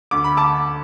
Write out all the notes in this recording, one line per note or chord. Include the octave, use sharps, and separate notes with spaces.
D2 D6
B5
A5 D6